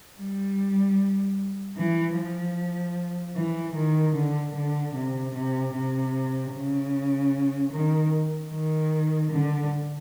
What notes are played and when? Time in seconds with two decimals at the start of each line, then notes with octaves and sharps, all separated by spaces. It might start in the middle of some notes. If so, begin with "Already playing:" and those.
0.18 G3
1.77 E3
2.17 F3
3.36 E3
3.75 D#3
4.15 D3
4.55 D3
4.95 C3
5.34 C3
5.74 C3
6.53 C#3
7.72 D#3
8.51 D#3
9.31 D3